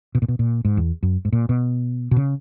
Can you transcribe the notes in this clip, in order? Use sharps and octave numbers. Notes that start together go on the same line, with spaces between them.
B2
A#2
B2
A#2
G#2
E2
F#2
G#2
A#2
B2
B2
C#3